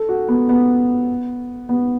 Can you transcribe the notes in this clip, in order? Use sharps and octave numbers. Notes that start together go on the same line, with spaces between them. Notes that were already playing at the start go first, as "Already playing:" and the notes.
Already playing: A4
F#4
B3
B3
B3